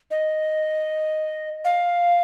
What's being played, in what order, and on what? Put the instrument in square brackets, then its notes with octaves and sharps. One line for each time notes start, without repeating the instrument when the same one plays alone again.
[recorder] D#5
F5